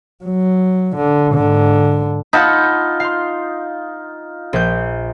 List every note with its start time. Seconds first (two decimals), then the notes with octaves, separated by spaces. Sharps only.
0.24 F#3
0.96 D3
1.32 G#2 D3
2.33 D#4 F4 F#5 A5 B5
3.00 F5 C6
4.53 A#1 G6